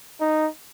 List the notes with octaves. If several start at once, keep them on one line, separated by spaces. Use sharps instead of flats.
D#4